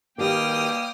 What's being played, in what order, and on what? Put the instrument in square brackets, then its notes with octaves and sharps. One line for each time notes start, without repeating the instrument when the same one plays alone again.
[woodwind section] B2 G3 A#3 [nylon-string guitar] D#3 G4 [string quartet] G5 D#6 F6